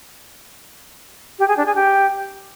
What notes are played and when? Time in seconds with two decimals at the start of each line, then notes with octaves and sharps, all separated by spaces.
1.39 G4
1.48 G#4
1.57 D4
1.66 G#4
1.75 G4